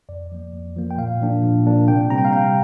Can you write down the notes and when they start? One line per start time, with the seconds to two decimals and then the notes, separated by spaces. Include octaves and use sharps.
0.09 F2 D5
0.32 F3 A#3
0.54 F2
0.76 F3 A#3
0.91 G5
0.98 A#2 F5
1.21 F3 A#3 D4
1.43 A#2
1.66 F3 A#3 D4
1.88 C3 G5
2.10 G3 C4 A#5
2.18 G5
2.25 F5
2.33 C3 G5